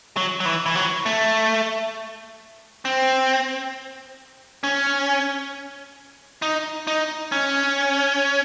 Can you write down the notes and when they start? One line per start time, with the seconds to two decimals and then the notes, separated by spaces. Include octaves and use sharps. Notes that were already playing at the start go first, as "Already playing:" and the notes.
0.17 F#3
0.40 F#3
0.45 E3
0.66 E3
0.75 F#3
1.06 A3
2.85 C4
4.64 C#4
6.42 D#4
6.87 D#4
7.32 C#4